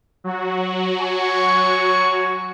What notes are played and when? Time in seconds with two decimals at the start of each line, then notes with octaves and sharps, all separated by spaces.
0.24 F#3 F#4
1.00 C#5 G#5 C#6